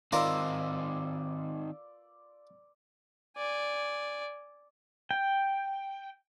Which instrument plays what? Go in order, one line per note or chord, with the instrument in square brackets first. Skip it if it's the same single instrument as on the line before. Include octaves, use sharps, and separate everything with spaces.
[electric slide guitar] D#3 C4 D#4 [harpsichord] F4 A#4 [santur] D5 C6 E6
[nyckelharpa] D5 G#5
[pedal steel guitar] G5